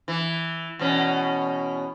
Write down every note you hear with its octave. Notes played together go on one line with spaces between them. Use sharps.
E3
E2 B2 C#4